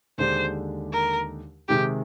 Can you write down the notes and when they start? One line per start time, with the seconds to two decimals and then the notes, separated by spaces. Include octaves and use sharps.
0.18 D#2 D3 G#3 D4 G4 C5
0.93 A#4
1.69 C3 D#3 G#3 D#4 G4